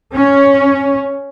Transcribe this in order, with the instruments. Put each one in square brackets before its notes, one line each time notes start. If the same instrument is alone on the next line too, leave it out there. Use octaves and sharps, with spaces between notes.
[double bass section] C#4